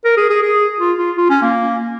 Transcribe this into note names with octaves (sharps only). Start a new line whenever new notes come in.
A#4
G#4
G#4
G#4
F4
F4
F4
C#4
A#3